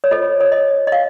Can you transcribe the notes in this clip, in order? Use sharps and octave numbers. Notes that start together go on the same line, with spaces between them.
C#5
F4 A4 C5 D#5
C#5
D#5
D#5
F5